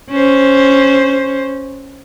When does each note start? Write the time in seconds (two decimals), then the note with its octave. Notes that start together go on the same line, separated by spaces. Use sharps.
0.11 C#4 C5